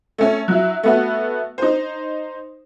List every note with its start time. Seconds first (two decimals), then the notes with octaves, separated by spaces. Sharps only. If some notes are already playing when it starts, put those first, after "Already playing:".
0.18 A3 C#4
0.48 F#3 E4
0.83 A3 B3 F#4
1.58 D#4 C5